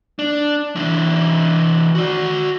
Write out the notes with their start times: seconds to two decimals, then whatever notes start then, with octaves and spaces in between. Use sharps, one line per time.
0.19 D4
0.76 E3 D4
1.95 F#4 D5